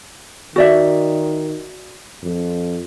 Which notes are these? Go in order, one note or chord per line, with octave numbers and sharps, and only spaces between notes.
D#3 F#4 D5 E5
F2